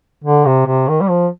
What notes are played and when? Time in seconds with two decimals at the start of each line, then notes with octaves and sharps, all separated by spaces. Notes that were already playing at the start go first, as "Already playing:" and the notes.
0.24 D3
0.46 C3
0.66 C3
0.88 D#3
1.01 G3
1.09 F3